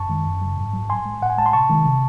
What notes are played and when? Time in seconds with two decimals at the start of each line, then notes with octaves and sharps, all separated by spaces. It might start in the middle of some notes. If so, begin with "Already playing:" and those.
Already playing: F#2 A5 C#6
0.10 D#3 G#3
0.26 F#2
0.41 C#3 F#3
0.58 G#2
0.73 F#3
0.90 A2 G#5 C6
1.05 G#3
1.21 A2 F#5
1.30 G#5
1.38 G#3 A5
1.46 C6
1.53 C3 A5 C#6
1.69 D#3 G#3
1.86 C3